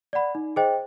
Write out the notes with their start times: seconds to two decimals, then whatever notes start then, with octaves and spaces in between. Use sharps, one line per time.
0.13 D5 F#5 B5
0.35 D#4
0.56 G#4 C5 D#5 G5